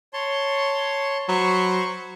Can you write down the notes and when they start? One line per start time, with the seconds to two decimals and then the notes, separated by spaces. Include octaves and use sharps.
0.13 C#5 A5 C6
1.28 F#3 C5 B5 C#6